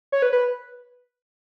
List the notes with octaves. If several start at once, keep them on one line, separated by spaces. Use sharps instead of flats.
C#5
B4
B4